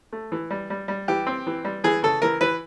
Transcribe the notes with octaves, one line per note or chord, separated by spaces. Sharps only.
A3
E3
G3
G3
G3
E3 G4
C4
E3
G3
E3 G#4
C#3 A4
E3 A#4
E3 B4